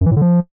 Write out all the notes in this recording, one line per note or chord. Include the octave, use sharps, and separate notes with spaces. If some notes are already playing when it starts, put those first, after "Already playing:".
F#2
E3
A2
D3
F3